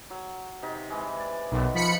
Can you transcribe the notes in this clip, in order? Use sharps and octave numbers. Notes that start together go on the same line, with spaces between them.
F#3
C3 D#4
E3 G#3
D5
B1 D#3 B3
F3 B5 C#7